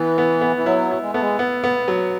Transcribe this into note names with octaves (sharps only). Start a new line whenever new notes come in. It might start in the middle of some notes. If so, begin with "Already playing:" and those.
Already playing: E3 B3
B3
B3
E3
F#3 E4
E4
G#3
A3 B3
G#3
B3
B3
F#3